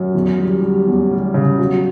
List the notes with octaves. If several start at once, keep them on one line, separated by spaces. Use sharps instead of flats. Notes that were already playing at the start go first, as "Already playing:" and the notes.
Already playing: F#2
E2
G3
G3
E2
G3
C#3
F#3